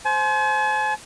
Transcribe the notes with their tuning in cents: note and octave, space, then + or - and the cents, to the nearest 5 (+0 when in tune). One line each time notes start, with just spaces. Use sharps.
C5 +0 G#5 +45